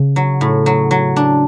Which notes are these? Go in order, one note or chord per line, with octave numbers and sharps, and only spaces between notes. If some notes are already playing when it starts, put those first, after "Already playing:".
Already playing: C#3
F#3
A2
F#3
F#3
D4